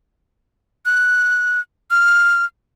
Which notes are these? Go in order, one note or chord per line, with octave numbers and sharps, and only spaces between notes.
F#6
F6